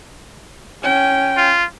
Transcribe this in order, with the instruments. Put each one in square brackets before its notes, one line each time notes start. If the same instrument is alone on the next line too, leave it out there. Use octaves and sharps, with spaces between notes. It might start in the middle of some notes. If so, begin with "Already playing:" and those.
[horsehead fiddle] C#4 G5
[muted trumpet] F4